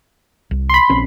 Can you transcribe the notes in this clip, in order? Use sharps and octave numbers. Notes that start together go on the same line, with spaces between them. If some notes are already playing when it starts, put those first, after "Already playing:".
C2
B5 C6
A#1 C4 C#4